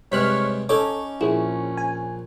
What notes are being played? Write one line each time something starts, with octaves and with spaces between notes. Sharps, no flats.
G2 C3 G#3 C#5 F6 F#6 B6
C#4 D#4 A4 C#5 D6
A#1 E4 G#4
G#5